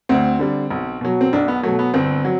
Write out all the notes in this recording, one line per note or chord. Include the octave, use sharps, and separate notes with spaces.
D2 C4
D3 G3
B1
B2 F#3
C4
B1 D4
B3
B2 F#3 A3
B3
G1 C4
F#3